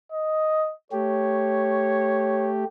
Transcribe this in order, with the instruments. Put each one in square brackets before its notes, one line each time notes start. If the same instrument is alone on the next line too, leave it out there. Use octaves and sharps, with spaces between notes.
[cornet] D#5
[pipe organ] A3 G4 [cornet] C#5